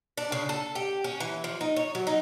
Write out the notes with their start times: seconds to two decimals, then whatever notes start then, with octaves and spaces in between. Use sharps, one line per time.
0.17 D4
0.32 C#3
0.49 A4
0.75 G4
1.04 C#4
1.20 E3
1.44 F3
1.61 D#4
1.76 C#5
1.95 F#3
2.07 D#4